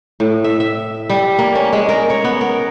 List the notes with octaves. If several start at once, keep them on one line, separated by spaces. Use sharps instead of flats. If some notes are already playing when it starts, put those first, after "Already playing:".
A2
E5
E5
G3
A#3
C#4
G#3
A#4
C#5
B3
A#4